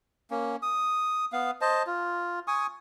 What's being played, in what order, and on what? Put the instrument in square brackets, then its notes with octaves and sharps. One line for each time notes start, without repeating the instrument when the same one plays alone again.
[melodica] A#3 C#4
D#6
B3 F5
C5 D#5 A5
F4
G#5 C#6 D#6